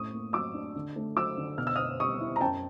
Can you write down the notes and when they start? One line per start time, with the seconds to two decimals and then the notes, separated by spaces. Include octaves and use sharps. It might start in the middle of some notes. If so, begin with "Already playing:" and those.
Already playing: A2 C#4 C#6 D#6
0.13 A#3
0.33 F#3 D6 E6
0.54 D4
0.76 D3
0.96 A3
1.16 F#3 D6 E6
1.38 D3
1.58 B2 F6
1.67 E6
1.76 D#6 F6
1.79 B3
2.00 G3 C#6 D#6
2.20 E4
2.36 A#5
2.41 F#2 G5 A5